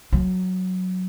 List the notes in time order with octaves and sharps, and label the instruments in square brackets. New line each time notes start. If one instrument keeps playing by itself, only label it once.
[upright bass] F#3